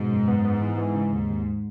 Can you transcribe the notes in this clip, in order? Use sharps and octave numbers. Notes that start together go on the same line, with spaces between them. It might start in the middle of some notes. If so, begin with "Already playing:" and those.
Already playing: G#2 B2
F#2
B3
B3
E3
E3
C#3
D#2
D#2